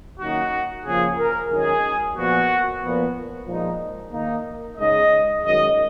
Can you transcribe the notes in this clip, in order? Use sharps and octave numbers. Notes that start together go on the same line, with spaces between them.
F#2 D#3 A#3 D#4 F#4
C#3 F3 A#3 F4 G#4
A#4
F#2 D#3 G#3 C#4 G#4
A#2 F3 B3 F#4
A#2 F3 B3
A#2 F3 G#3 D#4
D#3 A#3 D#4
C#3 G#3 D#4 D#5
F#2 D#3 G#3 D#5